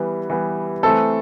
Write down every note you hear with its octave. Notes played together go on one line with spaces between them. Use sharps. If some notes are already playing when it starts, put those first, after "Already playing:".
Already playing: E3 G3 B3
E3 G3 B3
E3 A3 C4 A4